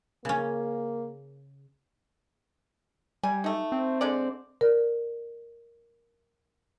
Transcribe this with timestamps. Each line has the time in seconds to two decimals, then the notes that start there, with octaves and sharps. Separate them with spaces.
0.25 C#3 A#3 C#4
3.23 G3 G#5
3.44 A3 D#4
3.72 C4
4.01 D3 G#3 D5
4.61 A#4 D5